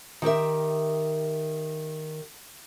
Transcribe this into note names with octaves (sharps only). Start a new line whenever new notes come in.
D#3 G4 A#4 E5